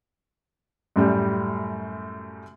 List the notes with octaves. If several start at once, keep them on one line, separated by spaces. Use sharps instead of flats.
F#2 A2 G3